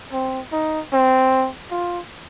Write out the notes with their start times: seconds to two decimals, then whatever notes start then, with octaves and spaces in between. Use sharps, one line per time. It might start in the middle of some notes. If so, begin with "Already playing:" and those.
0.13 C4
0.52 D#4
0.93 C4
1.71 F4